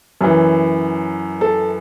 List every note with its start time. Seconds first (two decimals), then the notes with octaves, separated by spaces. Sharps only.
0.21 F#2 E3
1.41 A4